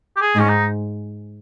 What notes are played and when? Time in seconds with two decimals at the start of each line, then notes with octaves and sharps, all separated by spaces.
0.16 G4
0.21 G#4
0.35 G#2 C#4
0.49 D#4